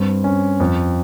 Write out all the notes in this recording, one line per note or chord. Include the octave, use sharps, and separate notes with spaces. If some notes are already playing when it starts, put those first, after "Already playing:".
Already playing: G2 C4
C#4
F2